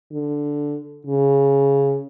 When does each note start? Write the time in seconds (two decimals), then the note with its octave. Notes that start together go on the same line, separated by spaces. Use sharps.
0.12 D3
1.07 C#3